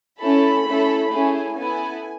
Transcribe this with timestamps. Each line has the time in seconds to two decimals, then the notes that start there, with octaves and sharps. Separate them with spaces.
0.19 A3 C#4 E4 A4 B5
0.65 A3 C#4 E4 A4
1.11 A3 C#4 E4 G#4 G#5
1.57 B3 E4 A4 G#5